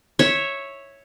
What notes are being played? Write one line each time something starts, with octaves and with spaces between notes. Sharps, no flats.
C#5 E5